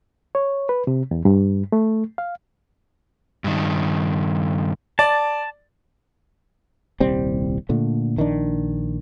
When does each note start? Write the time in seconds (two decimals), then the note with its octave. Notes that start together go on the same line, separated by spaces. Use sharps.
0.35 C#5
0.69 B4
0.87 C3
1.11 E2
1.25 G2
1.72 A3
2.18 F5
3.44 G2 D#3
4.99 D5 A5
7.00 D#1 C2 G3 C4
7.69 A#2 D3 A3
8.17 A#1 D#3 F#3 D4